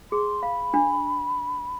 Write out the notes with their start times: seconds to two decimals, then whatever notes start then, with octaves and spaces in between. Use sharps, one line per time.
0.12 G#4 C6
0.42 F5 B5
0.74 D4